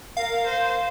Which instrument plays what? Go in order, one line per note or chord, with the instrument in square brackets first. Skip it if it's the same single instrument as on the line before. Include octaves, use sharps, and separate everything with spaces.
[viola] A#4 [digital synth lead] F5
[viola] C5